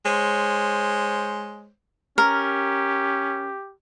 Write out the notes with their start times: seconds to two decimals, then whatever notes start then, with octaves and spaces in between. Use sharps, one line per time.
0.06 G#3 C5 C#5
2.18 C#4 G4 A#4